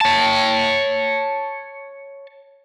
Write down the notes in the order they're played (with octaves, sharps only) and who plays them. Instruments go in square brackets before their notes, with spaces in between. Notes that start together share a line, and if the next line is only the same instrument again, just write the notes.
[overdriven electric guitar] C#5 A5